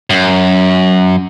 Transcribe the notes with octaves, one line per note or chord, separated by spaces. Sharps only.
F#2